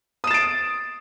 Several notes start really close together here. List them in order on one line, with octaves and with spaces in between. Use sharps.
D#6 E7 A6 D7